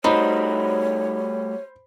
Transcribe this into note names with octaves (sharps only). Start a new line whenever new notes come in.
G3 A3 D#4 F#4 C5 C#5 B5